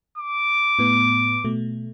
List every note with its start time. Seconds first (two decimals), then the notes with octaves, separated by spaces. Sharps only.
0.18 D6
0.79 A2 B3
1.45 B2 A3